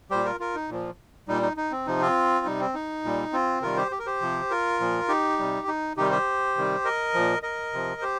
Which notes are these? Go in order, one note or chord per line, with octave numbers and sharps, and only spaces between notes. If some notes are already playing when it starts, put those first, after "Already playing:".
A#2 G3 G4 C5
F4 A#4
F4 A#4
D#4
A#2 F3
A#2 G3 D#4
D#4
D#4
C4
C3 F3 D#4
C4 F4
C3 G3 D#4
C4
D#4
A#2 G3
C4 F4
C3 D#3 G3 F4 A#4
G4 C5
G4
A#4
G4 C5
C3 F3
F4 A#4
A#2 F3
D#4 G4
C3 G3
D#4
C3 D#3 G3 D#4 G4
G4 C5
C3 D#3 G3
A#4 D#5
A#2 F3
A#4 D#5
C3 F3
G4 C5